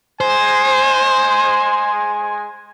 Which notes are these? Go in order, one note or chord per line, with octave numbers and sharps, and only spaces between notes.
G#3 C5 G#5